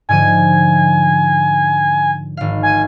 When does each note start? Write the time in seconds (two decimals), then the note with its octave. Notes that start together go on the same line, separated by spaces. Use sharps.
0.09 G#2 D3 F3 G#5
2.37 G#1 F5
2.63 G#5